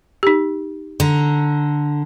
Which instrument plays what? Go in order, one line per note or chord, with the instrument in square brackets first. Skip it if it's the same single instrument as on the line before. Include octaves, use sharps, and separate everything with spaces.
[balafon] D#4 G4
[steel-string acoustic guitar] D3 A#5